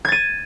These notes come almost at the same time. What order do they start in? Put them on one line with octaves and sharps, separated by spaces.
G#6 A6 D#7